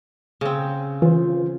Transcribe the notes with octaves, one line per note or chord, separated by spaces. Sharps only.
C#3 C4
E3 F4 C5